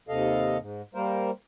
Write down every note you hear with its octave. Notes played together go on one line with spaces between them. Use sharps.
D#2 C3 A4 D#5 F5
G#2
G3 A#3 A#4 C5